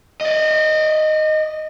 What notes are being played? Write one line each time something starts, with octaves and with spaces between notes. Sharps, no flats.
D5 D#5